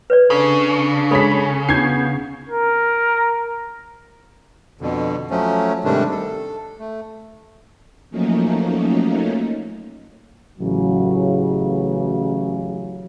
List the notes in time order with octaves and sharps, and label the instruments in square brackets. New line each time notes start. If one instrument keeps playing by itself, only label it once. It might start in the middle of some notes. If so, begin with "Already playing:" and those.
[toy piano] B4 C#5 D5
[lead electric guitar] C#3 [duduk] D4 [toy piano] A4
[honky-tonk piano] G#3 C#5 B6 [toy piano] A4 B5
[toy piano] B5
[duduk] B3 [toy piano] D4 D#4 [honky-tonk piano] G6 G#6 C7
[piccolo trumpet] A#4
[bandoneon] F2 B2 D3
F3 F#3 A3 C#4
G#2 C3 D#3 G3 A3 D4
A4
A3
[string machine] F3 F#3 A3 A#3 C#4 D#4
[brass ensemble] A1 C#3 F#3